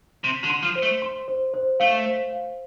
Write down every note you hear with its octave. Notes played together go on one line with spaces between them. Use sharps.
C3 C6
D3
C6
F3
C5
A3
C6
C5
C5
A3 F5
C5
F5